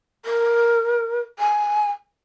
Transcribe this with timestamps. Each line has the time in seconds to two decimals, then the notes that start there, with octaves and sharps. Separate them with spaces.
0.25 A#4
1.39 G#5